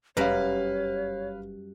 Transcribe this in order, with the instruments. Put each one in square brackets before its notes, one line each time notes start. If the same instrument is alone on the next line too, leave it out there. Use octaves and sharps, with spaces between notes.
[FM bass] F1 [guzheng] F#2 G3 A#4 [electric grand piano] B4 F5 [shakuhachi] C#5